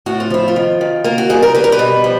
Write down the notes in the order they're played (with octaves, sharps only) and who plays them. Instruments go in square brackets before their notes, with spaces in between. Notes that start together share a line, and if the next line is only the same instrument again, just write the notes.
[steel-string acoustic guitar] A2 F#4
F4
F3 E4
F4
D#3
D#3
A#3 F4
F#4
G3 G#4
A#4
G3 B4
A#4
B4
B2
F3